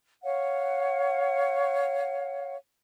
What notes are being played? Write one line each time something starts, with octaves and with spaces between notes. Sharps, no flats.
C#5 F5 F#5